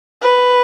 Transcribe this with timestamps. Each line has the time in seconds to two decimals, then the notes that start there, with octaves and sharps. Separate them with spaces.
0.22 B4